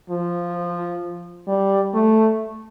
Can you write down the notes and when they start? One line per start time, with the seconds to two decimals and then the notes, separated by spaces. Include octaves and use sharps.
0.10 F3
1.48 G3
1.94 A3